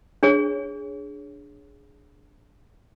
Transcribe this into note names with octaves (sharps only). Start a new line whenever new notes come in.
D4 G#4 C#5